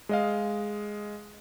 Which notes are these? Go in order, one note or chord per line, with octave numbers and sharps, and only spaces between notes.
G#3 D#5 F5